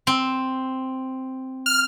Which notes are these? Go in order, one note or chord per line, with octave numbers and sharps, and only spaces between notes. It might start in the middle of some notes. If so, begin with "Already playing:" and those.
C4
F6